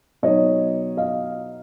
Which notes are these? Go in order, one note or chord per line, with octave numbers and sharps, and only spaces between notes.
B2 F#3 B3 D#4 C#5 D#5
D#5 F5